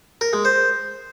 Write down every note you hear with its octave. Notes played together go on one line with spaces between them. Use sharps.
A#4
G#3
C5